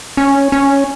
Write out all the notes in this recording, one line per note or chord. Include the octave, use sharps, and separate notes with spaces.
C#4
C#4